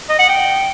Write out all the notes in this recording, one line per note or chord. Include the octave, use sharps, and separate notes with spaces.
D#5
F#5
G5